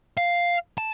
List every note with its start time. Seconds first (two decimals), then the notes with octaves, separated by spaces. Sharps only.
0.17 F5
0.78 A5